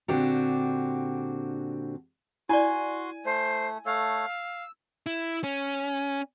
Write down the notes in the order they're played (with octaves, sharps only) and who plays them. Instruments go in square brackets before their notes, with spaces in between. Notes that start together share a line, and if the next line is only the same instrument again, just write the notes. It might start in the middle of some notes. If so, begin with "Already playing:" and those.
[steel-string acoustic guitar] A#2 D3 C4 D4 F#4 G4
[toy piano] E4 D5 [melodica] F#4 C6 [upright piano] G#5
[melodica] A3 [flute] C5
[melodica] A3 A4 C#5 [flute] F5
[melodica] E6
[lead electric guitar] E4
C#4